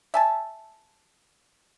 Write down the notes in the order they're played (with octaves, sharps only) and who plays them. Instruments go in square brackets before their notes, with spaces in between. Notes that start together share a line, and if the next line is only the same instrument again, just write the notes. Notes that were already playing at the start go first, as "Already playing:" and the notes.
[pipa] E5 G#5 A5